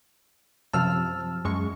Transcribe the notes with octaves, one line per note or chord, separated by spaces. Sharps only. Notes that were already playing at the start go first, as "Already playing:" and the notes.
F#2 C3 F3 A5 E6 F6
F#2 G#3 C#6